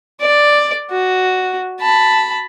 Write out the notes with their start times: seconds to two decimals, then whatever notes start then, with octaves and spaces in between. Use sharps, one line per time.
0.20 D5
0.91 F#4
1.81 A5 B5